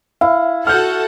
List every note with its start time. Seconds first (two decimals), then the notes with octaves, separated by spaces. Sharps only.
0.21 E4 F5
0.67 F#4 A4 F#5 F6 G6